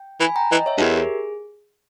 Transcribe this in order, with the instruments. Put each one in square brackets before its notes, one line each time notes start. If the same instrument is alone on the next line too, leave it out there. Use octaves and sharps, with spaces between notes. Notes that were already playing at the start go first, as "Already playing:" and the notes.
Already playing: [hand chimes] G5
[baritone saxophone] E3 [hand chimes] G#5 B5
[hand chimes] G5 A#5
[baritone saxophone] E3 [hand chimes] D#5 G5
[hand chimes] C#5 E5
[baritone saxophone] G2
[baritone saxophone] E2 [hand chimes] G4 A#4
[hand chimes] G#4